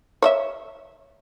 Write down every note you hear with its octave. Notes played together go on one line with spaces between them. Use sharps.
C#5 D#5 E5